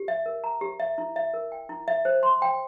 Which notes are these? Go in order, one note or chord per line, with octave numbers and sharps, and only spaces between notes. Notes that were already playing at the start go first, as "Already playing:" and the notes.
Already playing: G4
E5
A#4
A#5
G4
E5
E4
E5
A#4
G5
E4
E5
C5
C6
G5